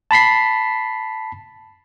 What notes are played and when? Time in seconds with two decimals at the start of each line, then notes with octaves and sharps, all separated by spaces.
0.11 A5 B5 B6 C7